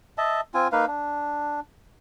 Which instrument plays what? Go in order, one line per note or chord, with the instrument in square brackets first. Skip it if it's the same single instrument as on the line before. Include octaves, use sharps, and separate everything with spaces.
[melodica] D#5 E5 A5
C4 F4 G#5
A#3 D#4 B4 F5
D4